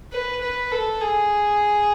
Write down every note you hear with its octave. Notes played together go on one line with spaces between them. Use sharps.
B4
B4
A4
G#4